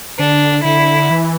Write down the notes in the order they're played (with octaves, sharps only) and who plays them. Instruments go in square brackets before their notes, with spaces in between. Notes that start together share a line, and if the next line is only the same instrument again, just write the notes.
[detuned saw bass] D3 [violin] D4
[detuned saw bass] D3 [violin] E4
[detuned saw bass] E3